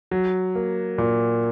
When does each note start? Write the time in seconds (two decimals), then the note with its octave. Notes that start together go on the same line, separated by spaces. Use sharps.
0.11 F#3
0.55 A#3
0.98 A#2